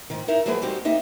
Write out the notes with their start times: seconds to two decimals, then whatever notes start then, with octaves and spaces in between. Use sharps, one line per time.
0.10 G#2 D#3
0.28 D#4 E4 A#4 E5
0.46 F3 F#3 G#3 A#3 G#4 B4
0.62 G3 G#3 C4 D#4 F#4 G4
0.85 A#3 C4 D#4 D#5 E5